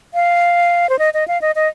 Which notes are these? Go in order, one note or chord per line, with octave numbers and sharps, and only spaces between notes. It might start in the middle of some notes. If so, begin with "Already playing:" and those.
F5
C5
D#5
D#5
F5
D#5
D#5